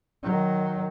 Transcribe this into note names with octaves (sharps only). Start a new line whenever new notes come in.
D#3 F#3